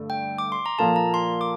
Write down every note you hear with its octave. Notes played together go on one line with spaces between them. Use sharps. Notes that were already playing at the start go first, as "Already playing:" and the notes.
Already playing: G2 D3 A3
G5
D6
C6
A#5
A#2 F3 A#3 F4 A4 A5
A#5
C6
D6